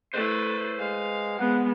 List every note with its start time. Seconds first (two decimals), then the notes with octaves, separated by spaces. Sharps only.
0.14 A3 E4 B4 C5
0.79 G#3 F5
1.39 G#3 B3 F#5